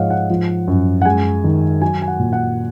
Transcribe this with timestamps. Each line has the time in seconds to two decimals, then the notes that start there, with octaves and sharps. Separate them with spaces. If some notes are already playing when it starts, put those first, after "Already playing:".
Already playing: G#2 F3 C#5 D#5 F5 F#5
0.10 F#5
0.30 F3
0.68 F#2
1.02 F#5
1.05 G#3 G#5
1.44 D#3
1.82 F#3 G#5
2.02 G#5
2.08 F#5
2.19 A#2
2.33 F#5